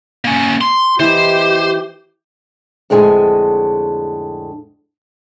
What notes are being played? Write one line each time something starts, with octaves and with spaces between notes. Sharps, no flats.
A#3 C#4
C6
E3 G4 C5 D#5
F2 A2 D3 G#3 G#5